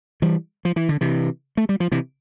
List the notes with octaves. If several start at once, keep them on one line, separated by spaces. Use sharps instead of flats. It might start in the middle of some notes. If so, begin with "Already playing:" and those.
E3 G3
F3
E3
D3
C3 E3
A3
G3
F3
C3 E3